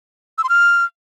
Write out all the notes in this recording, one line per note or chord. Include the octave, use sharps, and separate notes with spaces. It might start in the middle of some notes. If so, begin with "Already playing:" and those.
E6
C6
F6